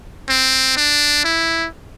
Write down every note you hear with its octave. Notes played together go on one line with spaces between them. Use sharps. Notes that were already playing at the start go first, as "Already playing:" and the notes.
C4
D4
E4